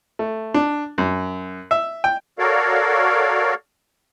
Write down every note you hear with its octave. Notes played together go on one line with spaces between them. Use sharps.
A3
D4
F#2
E5
G5
F#4 A4 A#4 C#5 D5 F5